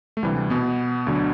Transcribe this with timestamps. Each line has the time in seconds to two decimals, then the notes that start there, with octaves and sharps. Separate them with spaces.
0.17 A3
0.23 D2 C3 E3 G3
0.37 G3
0.50 B2 B3
1.07 D2 D3 F#3